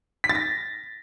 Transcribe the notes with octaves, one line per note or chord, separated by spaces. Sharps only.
B6
A6
A#6